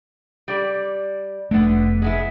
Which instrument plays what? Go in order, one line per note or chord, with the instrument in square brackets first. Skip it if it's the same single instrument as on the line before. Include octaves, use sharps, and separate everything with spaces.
[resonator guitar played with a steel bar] G3 D5
[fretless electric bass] F1 A3 [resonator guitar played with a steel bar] D3 B3
[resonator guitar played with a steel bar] G#3 B3 E4